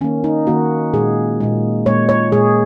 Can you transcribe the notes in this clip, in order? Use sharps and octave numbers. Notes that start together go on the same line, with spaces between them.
D#3 A#3 C#4
D#4
D#3 A#3 F#4
A#2 G#3 G#4
A#2 G#3
A#2 G#3 C#5
C#5
A#2 G#3 G#4